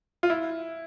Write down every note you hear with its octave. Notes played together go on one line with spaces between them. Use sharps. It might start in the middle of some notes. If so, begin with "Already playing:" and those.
F4
E4